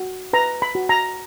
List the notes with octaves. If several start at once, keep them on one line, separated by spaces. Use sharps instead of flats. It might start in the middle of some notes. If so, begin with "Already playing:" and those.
Already playing: F#4
B4 A#5
B5
F#4
A#5